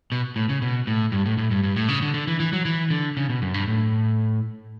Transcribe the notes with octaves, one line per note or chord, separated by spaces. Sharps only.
B2
A2
C#3
B2
A2
G2
A2
A2
G2
G2
A2
C#3
D3
D3
E3
E3
F#3
E3
D3
C#3
B2
F#2
G2
A2